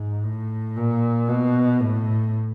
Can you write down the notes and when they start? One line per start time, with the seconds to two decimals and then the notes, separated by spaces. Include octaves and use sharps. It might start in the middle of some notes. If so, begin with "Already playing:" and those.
Already playing: G#2
0.24 A2
0.76 A#2
1.28 B2
1.80 A2